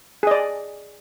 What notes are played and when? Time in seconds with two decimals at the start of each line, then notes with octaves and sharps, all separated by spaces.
0.23 G#4
0.27 D#5
0.31 D5